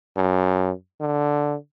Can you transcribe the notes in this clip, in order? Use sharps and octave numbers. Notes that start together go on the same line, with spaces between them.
F#2
D3